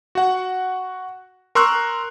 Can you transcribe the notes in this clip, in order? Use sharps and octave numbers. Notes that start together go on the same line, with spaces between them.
F#4 F#5
A#4 C6 C#6 E6 F#6